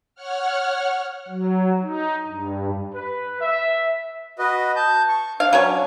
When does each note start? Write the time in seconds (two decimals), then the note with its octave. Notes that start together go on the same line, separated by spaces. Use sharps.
0.15 C#5 F#5 F6
1.28 F#3
1.82 D#4
2.28 G2
2.93 B4
3.40 E5
4.39 F#4 B4 D#5
4.76 A5 G6
5.08 C#6
5.40 D4 F5
5.53 F#3 C#4 C#5